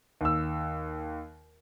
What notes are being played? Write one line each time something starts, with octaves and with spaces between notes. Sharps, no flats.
D#2 E6